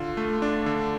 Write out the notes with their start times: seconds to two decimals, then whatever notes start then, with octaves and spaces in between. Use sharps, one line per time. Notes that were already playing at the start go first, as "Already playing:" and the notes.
Already playing: D3 F4
0.17 A3
0.42 D4
0.66 D3